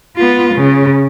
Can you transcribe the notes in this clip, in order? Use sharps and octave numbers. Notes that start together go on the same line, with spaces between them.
B3 F4
C#3